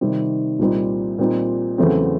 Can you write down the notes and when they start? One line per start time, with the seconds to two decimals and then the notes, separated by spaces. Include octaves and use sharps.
0.01 C3 D#3 G3 C4
0.59 C2 A#2 G3 C4 D#4
1.18 A#2 G3 C4 D#4
1.78 E2 C#3 F#3 A3 C4